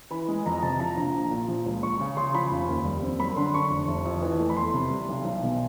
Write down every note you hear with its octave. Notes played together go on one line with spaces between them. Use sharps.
E3 B5
G#3
F2 A#5
C3 A5
F3 A#5
A#1 A#5
A#1
A#2
F3
C#2
C#2 C#6
C#3
C#3 C6
F3 B5
F1
D#2
G3
C4
F#2 B5
D3 C6
D3 C#6
F1
F1
F2
E3
A3
B5
E2 C6
C3
G3
B1
B1
B2